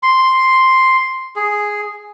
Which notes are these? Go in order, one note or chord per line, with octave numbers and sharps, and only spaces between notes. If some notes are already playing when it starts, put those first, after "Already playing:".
C6
G#4